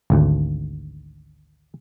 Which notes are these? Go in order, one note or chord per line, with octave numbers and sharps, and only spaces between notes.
G#1 D2